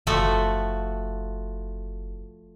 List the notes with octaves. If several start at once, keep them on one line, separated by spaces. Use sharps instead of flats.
F#1 F3 A3 F#4